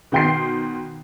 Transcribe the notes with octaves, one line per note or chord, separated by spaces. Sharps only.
B2 D#3 G5 C6 C7